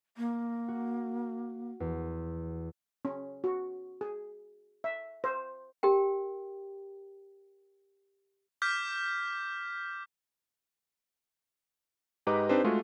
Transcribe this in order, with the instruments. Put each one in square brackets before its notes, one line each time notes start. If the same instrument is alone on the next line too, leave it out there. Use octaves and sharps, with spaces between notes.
[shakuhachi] A#3
[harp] F#4
E2
[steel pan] C#4
F#4
G#4
E5
C5
[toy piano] G4 A#4 G5
[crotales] D6 F6 G6 B6
[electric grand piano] G#2 G4 B4 D#5 A#5 D6
C4 D4 D#4 G4 B4 C5
G#3 A3 F4 F#4 G#4